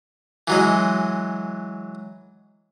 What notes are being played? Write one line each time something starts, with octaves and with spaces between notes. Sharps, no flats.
E3 F#3 G#3